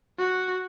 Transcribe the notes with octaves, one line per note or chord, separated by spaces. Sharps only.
F#4